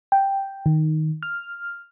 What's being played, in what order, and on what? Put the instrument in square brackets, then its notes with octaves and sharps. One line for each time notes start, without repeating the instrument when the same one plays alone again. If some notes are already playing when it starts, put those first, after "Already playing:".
[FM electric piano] G5
D#3
F6